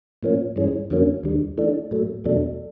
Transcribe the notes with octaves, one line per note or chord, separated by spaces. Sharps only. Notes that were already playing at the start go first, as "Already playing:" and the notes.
A2 F3 A#3 C#4
G2 E3 G#3 C#4
F2 D3 F#3 A#3 C#4
D#2 D3 G3
E3 A3 D4
A2 F#3 A3
E2 B2 F#3 A3 D4